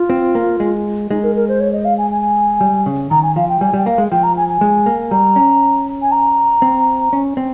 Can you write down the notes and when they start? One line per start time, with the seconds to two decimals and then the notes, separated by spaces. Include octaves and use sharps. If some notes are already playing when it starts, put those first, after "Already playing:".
Already playing: F4
0.10 C4
0.35 A#3
0.60 G#3
1.10 G#3 D#4
1.23 A#4
1.36 A#4
1.48 C5
1.60 C#5
1.73 D#5
1.85 F5
1.98 G#5
2.11 G#5
2.61 G3
2.86 C#3
3.11 D#3 A#5
3.23 G#5
3.36 F3 F5
3.49 G5
3.61 G3 G#5
3.74 G3 G5
3.86 A#3 F5
3.98 G#3
4.11 F3 G5
4.23 A#5
4.37 G#5
4.49 G#5
4.61 G#3
4.86 A#3
5.11 G3 A#5
5.36 C#4
6.02 G#5
6.12 A#5
6.62 C4
7.13 C#4
7.37 C4